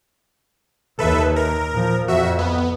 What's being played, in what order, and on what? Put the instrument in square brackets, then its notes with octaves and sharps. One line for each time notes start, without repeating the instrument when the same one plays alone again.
[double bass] D#2 [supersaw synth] A4 B4 E5
[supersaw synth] A#4
[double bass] A#2 F3
[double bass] F2 [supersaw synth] F#4 E5
[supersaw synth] B3